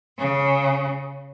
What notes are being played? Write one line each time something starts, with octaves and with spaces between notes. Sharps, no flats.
C#3